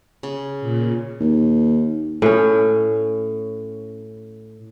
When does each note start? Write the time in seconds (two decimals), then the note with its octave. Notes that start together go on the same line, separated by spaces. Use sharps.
0.23 C#3
0.61 A#2
1.20 D#2
2.22 A2 C#4